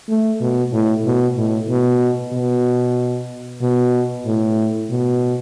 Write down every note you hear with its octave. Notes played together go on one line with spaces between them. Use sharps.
A3
B2
A2
B2
A2
B2
B2
B2
A2
B2